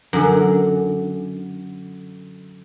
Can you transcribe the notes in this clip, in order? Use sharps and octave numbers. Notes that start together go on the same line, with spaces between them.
F#2 D3